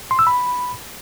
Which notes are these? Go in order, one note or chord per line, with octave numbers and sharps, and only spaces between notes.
C6
E6
B5